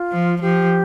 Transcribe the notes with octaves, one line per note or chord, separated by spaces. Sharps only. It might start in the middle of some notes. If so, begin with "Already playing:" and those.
Already playing: F4
F3
F3 G4